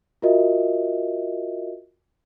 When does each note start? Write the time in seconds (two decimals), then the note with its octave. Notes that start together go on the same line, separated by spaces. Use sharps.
0.22 F4 F#4 A#4 D#5 E5